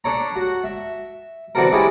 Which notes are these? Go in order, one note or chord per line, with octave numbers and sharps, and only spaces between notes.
D4 A4 C#5 A#5
F#4
E5
D3 E3 C4 F#4 A4 A#4
G#3 C#4 E4 G4 A4